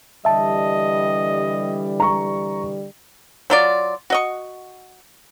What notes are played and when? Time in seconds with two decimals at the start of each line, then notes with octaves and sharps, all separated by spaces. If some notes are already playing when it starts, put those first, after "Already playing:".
0.25 D3 E3 G3 D#5 E5 A5
2.00 A#5 C#6
3.50 F#3 F4 D5
4.10 F#4 D#5 C#6